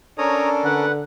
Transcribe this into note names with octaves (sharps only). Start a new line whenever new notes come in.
C#4 D4 A4 A#4 C#5 A#5 D#6
D3 B4 F#5